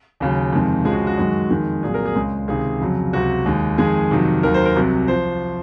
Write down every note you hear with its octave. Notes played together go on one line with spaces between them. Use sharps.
D#2 C#3 F#3
F2 C3 D#3 G#3
C#2 C#3 F3 G#3 G#4
F#4
F#4
F#2 D#3 G#3
F2 D#3 G#3
C2 A#2 F#3 G#4
A#4
G#4
C#2 C#3 G#3
C#2 C3 D#3 G#4
F2 C#3 F#3
C#2 C3 F#3 F#4
D#2 D#3 G#3
F2 D#3 G#3 G#4
F2 C3 D#3 F#3
D#2 D#3 F#3 A#4
C5
A#4
C2 C3 F#3
F3 C5